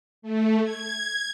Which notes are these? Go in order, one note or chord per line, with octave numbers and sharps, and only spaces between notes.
A3
G#6